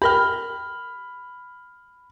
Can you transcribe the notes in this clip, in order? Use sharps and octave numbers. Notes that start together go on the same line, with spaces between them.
G4 A#4 G5 B5 F6